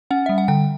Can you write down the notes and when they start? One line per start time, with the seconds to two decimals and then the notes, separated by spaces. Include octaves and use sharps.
0.11 C#4 F#5
0.26 G3 E5
0.38 F#5
0.48 D3 G5